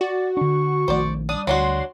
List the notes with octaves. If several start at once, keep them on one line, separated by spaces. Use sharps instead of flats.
F#4 D5
D3 D4 C#6
A#1 D#3 A3 C5 D5
G3 D4 D#6
D2 F#3 D4 F#4 C6